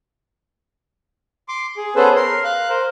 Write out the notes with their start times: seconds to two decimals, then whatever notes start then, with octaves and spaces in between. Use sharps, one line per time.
1.49 C6 D6
1.77 G#4
1.96 B3 C#4 G#4 A4 B4 C5
2.16 A#4 C6
2.44 F5 F#6
2.70 A#4 C5